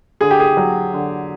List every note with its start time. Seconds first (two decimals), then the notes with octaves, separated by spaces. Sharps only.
0.21 D3 G#4
0.31 G4
0.40 G#4
0.57 F#3
0.94 D3